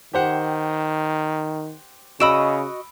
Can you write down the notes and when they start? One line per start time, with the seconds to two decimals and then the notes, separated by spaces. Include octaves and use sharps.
0.13 D#3 G4 C5 F#5
2.20 C#3 F#4 D#5 B5 E6 D7 E7